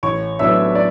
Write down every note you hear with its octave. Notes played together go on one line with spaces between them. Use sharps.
A1 C#5 C#6
A2 F#3 B3 D4 E5 E6
D5